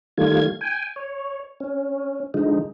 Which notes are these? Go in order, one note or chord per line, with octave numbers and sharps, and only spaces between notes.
D#3 G3 A3 F4 G#6
G5 G#5
C#5
C#4
D3 F3 G#3 D#4